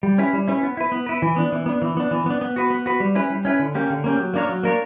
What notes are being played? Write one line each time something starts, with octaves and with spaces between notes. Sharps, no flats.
G3
C#4 E4 B4
G3
C#4 E4 B4
B3
E4 B4
B3
E4 B4
E3
B3 D4
E3
B3 D4
E3
B3 D4
E3
B3 D4
B3
F#4 B4
B3
F#4 B4
G3
C#4 E4 B4
G3
C#4 E4 B4
D3
A#3 C#4 G4
D3
A#3 C#4 G4
F#3
A#3 D4 A#4 C#5
F#3
A#3 D4 A#4 C#5